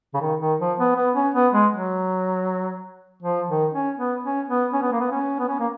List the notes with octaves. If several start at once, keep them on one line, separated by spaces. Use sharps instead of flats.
C#3
D#3
D#3
F3
B3
B3
C#4
B3
G#3
F#3
F3
D#3
C#4
B3
C#4
B3
C#4
B3
A#3
B3
C#4
B3
C#4
A#3